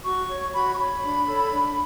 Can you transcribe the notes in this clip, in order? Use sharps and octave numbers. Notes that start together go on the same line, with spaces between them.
F#4 C#6
C#5
F#4 B5
C#6
C#5 B5
D4
A4 C#5
D4